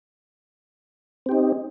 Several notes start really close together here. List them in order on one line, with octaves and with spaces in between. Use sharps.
C4 G4 D#4